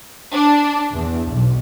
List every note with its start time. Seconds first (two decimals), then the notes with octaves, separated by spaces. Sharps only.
0.33 D4
0.93 E2
1.30 B1